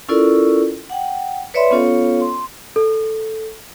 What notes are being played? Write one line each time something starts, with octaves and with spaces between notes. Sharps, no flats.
C#4 E4 F4 A4 A#4 D5
F#5 G5
B4 C#5 D5 E5 B5 C6
B3 C#4 F4 A4 C#5 F5
C6
A4